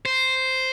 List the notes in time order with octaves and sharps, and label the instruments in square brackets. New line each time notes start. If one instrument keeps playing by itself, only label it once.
[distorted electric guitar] C5